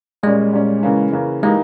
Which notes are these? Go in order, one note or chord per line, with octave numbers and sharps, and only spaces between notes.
A#2 G3 G#3 C#4
A#2 G3 C#4
C#3 E3 A#3 C#4
C#3 E3 A#3 C#4
E3 G#3 A#3 D#4 G4